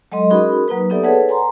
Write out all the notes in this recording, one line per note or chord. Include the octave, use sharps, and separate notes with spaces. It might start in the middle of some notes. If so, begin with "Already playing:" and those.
F#3 G#3 A4 D#5 C6
C#4 D#4 F#4 G#4 A#4 B5
F#3 A#3 D#4 B4
B3 D#4 G4 A4 D5 E5
G#4 A4 B4 C#5 F#5 A5
G#5 A#5 C6